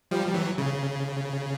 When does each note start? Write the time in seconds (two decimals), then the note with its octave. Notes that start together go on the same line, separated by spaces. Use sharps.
0.11 F3 G3
0.27 G3
0.34 E3 F#3
0.58 C#3